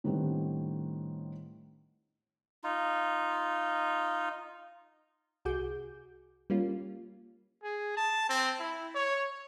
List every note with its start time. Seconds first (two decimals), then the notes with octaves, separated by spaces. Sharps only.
0.04 A2 D#3 G3 B3 C4 D4
2.64 D#4 F4
5.45 C2 F#4 G#4 D6 G6
6.50 G3 A#3 C#4 F4
7.63 G#4
7.97 A5
8.29 C4
8.59 E4
8.95 C#5